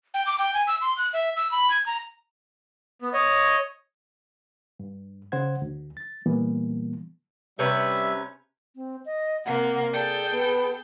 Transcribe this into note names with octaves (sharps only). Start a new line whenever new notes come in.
G5
D6
G5
G#5
E6
C6
F#6
E5
E6
B5
G#6
A#5
B3
C#5 D#5
G2
C#3 C5 F#5 G#6
D2
A6
A#2 E3 G3 A#3 B3
C3 G3 C#4 B4 E5
C4
D#5
C3 A#3 F#5
G#4 A4 D5 G5
B3